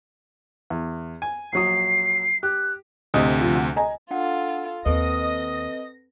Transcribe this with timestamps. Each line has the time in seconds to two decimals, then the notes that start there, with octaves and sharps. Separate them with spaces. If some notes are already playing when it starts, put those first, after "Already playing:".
0.70 E2
1.22 G#5
1.53 A#1 F#3 D#6 C7
2.43 G4 F#6
3.14 D2 A2 C3 D#5 D#6
3.41 F3 F4
3.55 F#5
3.76 D#5 G#5 A#5
4.11 D4 F4 A4 F#5
4.86 D#2 C4 A4 B4 D#5 A#6